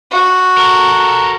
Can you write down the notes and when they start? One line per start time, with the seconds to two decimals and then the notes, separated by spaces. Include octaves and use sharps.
0.11 F#4
0.57 A4 A#4